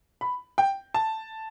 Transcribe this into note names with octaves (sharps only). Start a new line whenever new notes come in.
B5
G5
A5